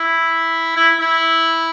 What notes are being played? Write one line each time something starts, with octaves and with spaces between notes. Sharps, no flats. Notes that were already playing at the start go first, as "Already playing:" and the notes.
Already playing: E4
E4
E4